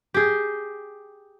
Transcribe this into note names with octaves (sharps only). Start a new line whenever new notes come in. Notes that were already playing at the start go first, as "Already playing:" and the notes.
G4 G#4